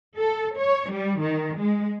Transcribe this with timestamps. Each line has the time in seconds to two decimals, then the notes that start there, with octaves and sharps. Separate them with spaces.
0.17 A4
0.58 C#5
0.92 G3
1.21 D#3
1.59 G#3